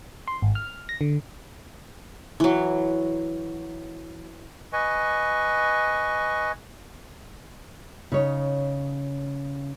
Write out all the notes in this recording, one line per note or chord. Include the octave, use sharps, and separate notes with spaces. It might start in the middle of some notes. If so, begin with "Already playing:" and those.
C6
G#1
F6
A#6
D3
E3 F#3
B4 D#5 G#5 C#6
C#3 D#4 C#5